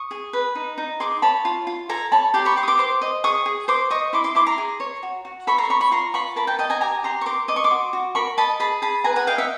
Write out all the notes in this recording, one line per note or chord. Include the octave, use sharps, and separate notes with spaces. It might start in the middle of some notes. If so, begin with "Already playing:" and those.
Already playing: C#6 D#6
G#4
B4
D#4
D#4
G#4 C6 D6
C#5 A5 B5
F4
F4
A4 G#5 A#5
C#5 A5 B5
G4 A#5 C6
B5 C#6
G4 C6 D6
D#6
C6 D6
C5 C6 D6
D#5
G#4 C#6 D#6
G#4
C5 C6 D6
D#5 C#6 D#6
E4 C6 D6
C6 D6
E4 C6 D6
A#5 C6
G#4
C#5
F#4
F#4
A4 B5 C#6
A#5 C6
C#5 B5 C#6
B5 C#6
F4 A#5 C6
F4 B5 C#6
A#4 A5 B5
G5 A5
D#5 G5 A5
G#5 A#5
G4 G#5 A#5
G4 A#5 C6
C#6
A#4 C6 D6
D#5 D6
C#6
C6 D6
F#4
F#4
A#4 B5 C#6
D#5 A5 B5
G#4 A5 B5
G#4 A5 B5
B4 G#5 A#5
F#5 G#5
D#5 F5 G5
E5 F#5